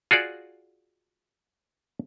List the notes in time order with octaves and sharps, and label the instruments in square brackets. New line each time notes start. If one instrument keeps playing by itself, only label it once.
[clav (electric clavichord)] F4 F#4 G#4 D5